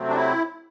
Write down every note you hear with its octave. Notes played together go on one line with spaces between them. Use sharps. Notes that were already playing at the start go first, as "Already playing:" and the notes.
Already playing: C3 F#3 A3 C4
D4
E4